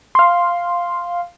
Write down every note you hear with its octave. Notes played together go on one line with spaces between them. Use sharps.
F5 C6